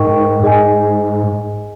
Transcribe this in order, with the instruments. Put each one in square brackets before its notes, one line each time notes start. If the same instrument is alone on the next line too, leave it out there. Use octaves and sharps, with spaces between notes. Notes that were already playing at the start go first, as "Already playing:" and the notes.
Already playing: [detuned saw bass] G#2 [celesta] D#4 A#4 D#5 G5 C#6
[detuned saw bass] G#2 [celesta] G#4 D#5 G#5